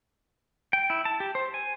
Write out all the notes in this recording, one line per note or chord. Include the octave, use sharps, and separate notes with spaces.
G5
E4
A5
G4
C5
G#5